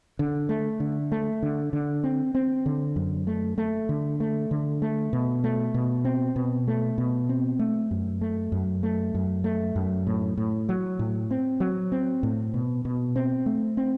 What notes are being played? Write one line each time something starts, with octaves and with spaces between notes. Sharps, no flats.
D3
A3
D3
A3
D3
D3
C4
C4
D3
F#2
A3
A3
D3
A3
D3
A3
B2
A3
B2
C4
B2
A3
B2
C4
A3
F#2
A3
F#2
A3
F#2
A3
F#2
A2
A2
F#3
A2
C4
F#3
C4
A2
B2
B2
C4
A3
C4